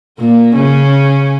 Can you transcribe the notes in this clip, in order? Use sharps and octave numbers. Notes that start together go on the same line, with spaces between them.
A#2 A#3
C#3 C#4